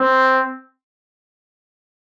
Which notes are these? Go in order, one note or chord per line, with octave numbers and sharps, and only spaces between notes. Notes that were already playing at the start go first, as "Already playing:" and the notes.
Already playing: C4